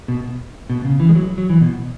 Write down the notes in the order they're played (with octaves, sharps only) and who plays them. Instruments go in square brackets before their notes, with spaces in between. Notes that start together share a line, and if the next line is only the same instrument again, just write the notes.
[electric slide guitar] B2
B2
C#3
E3
G#3
F#3
F#3
E3
B2